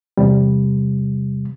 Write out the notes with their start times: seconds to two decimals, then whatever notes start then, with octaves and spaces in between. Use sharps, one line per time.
0.17 E2 C3 G3